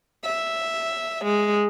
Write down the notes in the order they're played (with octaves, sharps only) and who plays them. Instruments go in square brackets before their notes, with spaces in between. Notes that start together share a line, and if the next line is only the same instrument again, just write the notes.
[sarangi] E5
G#3